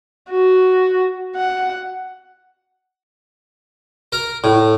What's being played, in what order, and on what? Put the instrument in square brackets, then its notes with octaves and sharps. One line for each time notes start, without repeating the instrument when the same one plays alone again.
[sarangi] F#4
F#5
[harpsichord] A#4
A2